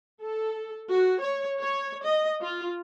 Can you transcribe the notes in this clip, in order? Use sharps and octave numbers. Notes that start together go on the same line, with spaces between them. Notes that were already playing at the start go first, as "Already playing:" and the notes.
A4
F#4
C#5
C#5
D#5
F4